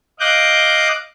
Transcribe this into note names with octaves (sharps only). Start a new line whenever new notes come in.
D#5 F5 D6 F#6 G6